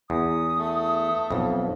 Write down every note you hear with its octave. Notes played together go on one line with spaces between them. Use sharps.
E2 D#6
A3
B1 F2